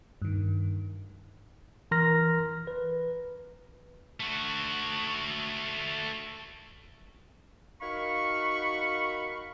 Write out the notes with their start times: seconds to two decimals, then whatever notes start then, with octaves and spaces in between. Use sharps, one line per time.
0.22 G2 D#3
1.91 E3 A#4 A#5 C6 F6 A#6
2.67 B4
4.20 A3 F#4
7.80 D#4 F#4 A#4 F5 B5 C#6